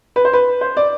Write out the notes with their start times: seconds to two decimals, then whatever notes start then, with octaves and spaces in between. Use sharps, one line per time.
0.16 B4
0.25 C5
0.33 B4
0.61 C5
0.77 D5